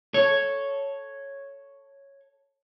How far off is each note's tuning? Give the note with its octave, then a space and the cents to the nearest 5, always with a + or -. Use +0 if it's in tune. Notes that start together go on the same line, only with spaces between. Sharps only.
A4 +0 C#5 +0